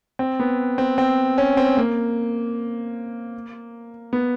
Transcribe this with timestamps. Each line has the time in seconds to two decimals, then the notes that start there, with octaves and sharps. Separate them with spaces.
0.19 C4
0.40 B3
0.78 C4
0.98 C4
1.38 C#4
1.57 C4
1.77 A#3
4.13 B3